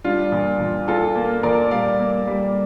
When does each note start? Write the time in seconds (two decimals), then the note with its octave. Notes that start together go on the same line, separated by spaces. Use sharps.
0.04 G3 D4 F4
0.32 A#2
0.60 A#2
0.88 A#2 F4 A4
1.16 A#3
1.43 A#2 A#4 D5
1.71 G3 D5 F5
2.00 A#3
2.27 G3